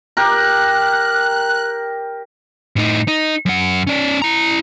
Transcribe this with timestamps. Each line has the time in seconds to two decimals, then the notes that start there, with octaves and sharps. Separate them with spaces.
0.17 G4 A#4 F#6
2.76 A2 D#4
3.08 D#4
3.46 F#2 F#5
3.87 C#4 D5
4.22 E4 A#5